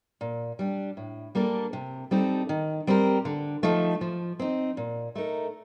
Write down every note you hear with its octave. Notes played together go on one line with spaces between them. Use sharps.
A#2
G3 D4 G4
A2
G3 A#3 D4 A4
C3
G3 C4 D#4 A4
D#3
G3 C4 G4 A#4
D3
F3 A3 D#4
F3
C4 D#4
A#2
A3 D#4 A#4